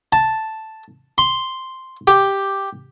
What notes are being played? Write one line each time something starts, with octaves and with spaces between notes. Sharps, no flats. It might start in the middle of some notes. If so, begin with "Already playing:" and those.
A5
C6
G4